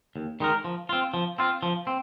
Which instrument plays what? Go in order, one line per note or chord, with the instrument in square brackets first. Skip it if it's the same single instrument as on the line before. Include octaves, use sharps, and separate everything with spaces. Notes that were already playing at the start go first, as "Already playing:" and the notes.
[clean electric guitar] D#2
D#3 G#3 D#4 A#4
F3
C4 F4
F3
C4 F4
F3
C4